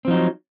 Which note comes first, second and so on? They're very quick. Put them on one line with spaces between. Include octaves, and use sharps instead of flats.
C4 F3 D#4 F#3